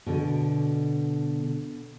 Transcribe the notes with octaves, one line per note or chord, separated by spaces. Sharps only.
B2 D3